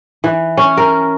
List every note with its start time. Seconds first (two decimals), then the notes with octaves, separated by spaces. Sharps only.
0.24 E3
0.57 C#4
0.77 A#4